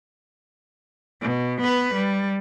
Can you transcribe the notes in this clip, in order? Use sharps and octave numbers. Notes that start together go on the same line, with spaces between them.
B2
B3 B4
G3